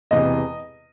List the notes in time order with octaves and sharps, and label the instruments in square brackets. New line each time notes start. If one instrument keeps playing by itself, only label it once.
[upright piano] E1 E2 C3 D#5